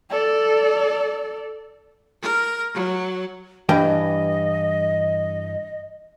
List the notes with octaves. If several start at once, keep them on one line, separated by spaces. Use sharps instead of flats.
A4 D5
A#4
F#3
G2 E3 D#5 G5